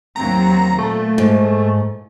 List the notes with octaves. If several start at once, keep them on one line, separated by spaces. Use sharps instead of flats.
D#2 F#3 C4 A#5
A#2 A3
G#2